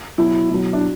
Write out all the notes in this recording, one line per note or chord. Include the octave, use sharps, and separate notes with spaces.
B2 F#3 E4
B2 F#3
D4